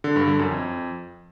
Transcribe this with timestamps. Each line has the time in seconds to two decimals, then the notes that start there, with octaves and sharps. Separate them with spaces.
0.04 D3
0.16 G2
0.28 D3
0.39 F#2
0.51 F2